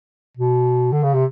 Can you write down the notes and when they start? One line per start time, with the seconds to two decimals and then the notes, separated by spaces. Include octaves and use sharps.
0.37 B2
0.92 D3
1.03 C#3
1.14 C3